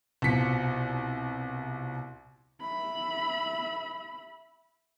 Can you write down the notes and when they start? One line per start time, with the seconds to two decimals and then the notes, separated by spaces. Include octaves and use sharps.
0.22 C2 B2 F3 B6 C#7
2.61 E5 B5